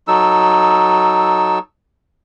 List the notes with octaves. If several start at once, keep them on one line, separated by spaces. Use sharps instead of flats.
F#3 D#4 A4 E6